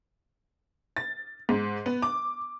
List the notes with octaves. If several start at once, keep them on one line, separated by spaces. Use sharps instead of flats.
A6
G#2
B3
D6